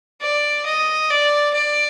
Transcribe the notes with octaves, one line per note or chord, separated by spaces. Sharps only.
D5
D#5
D5
D5